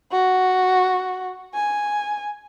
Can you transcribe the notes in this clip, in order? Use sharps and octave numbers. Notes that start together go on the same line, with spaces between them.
F#4
G#5